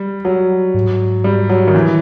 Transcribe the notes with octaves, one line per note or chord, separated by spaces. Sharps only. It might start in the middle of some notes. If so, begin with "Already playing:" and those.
Already playing: G3
F#3
G#2
G3
F#3
D#3
E3